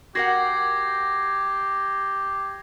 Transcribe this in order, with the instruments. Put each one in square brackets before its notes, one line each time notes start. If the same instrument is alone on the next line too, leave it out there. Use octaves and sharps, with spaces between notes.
[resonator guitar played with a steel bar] F#4 A#4 F#5 [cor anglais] G4 [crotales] G#6 A#6 C7